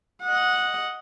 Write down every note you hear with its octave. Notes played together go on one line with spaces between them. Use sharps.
D#5 F#5